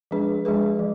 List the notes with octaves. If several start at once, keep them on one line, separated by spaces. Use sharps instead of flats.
F3 G#3 D4 G#4 B4
F3 G#3 D4 G#4 B4
F3